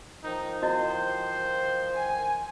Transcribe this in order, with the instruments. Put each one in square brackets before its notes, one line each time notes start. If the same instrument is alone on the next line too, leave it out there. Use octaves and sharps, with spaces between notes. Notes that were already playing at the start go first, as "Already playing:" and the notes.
[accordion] D#3 F3 [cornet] D#4
[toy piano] E4 F#4 D#5 [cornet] C5
[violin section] G#5